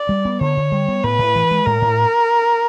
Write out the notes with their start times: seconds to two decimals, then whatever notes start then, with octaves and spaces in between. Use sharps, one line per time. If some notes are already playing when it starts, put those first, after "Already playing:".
Already playing: D5
0.09 G3
0.25 B3
0.41 D3 C#5
0.57 D3
0.72 G3
0.88 B3
1.04 A2 B4
1.19 A2
1.36 E3
1.51 G#3
1.66 A2 A#4
1.82 A2